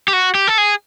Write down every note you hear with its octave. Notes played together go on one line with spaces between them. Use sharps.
G4
F#4
G4
A4
G#4